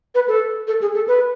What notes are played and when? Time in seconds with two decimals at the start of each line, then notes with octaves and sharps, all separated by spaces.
0.15 B4
0.28 A4
0.68 A4
0.81 G#4
0.95 A4
1.08 B4